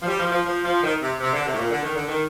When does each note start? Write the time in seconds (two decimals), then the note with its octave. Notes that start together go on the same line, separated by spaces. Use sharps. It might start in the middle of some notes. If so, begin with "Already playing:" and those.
0.02 F3
0.07 G3
0.20 F3
0.32 F3
0.46 F3
0.65 F3
0.84 D#3
1.02 C3
1.20 C3
1.33 D3
1.46 C3
1.54 A2
1.59 A#2
1.71 D3
1.84 D#3
1.96 D3
2.08 D#3